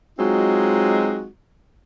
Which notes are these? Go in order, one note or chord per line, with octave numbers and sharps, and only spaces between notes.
F#3 G#3 C4 D#4 F4 F#4